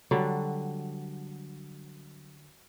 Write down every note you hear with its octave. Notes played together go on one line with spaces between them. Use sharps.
D3 F#3 G3